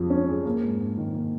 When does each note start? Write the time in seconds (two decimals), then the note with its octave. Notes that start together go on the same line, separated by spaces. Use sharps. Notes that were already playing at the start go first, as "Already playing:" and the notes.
Already playing: F2 F3 G#4
0.10 C#4
0.28 G#4
0.45 A#3
0.63 G#2
0.80 G#2
0.97 D#3
1.14 A#3